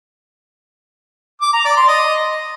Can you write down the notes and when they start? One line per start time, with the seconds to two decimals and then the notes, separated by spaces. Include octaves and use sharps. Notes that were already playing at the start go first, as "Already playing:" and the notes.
1.42 D6
1.53 A#5
1.65 D5
1.76 C6
1.88 D#5